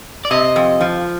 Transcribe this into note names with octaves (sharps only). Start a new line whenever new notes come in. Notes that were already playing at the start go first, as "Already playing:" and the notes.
D5
C3 D#5
F2
F3